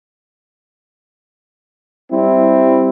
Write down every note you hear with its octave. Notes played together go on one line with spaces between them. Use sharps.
G3 C4 E4